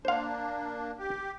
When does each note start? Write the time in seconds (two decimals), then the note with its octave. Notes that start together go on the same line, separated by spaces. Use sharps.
0.05 A#3 D4 C5 F5
0.99 G4